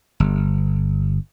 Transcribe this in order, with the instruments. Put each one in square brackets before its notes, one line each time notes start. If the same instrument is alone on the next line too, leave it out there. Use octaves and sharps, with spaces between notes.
[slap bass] G1